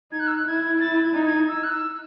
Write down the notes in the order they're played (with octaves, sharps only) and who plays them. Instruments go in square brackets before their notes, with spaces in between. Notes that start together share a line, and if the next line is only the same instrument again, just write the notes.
[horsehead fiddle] D#4 [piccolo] G#6
[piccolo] F#6
E6
F#6
[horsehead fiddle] E4 [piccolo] G#6
[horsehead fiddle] E4 [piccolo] A6
[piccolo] G#6
[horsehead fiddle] D#4
[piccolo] G#6
E6
F#6
E6